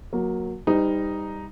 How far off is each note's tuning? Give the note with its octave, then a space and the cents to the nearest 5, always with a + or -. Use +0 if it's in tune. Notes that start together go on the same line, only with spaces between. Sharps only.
F#3 -10 A#3 +5
G3 +20 D#4 +0 B4 +45